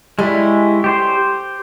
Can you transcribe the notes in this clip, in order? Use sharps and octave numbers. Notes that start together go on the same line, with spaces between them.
G3 G#3 C#4 E4 A4
G4 C5 C6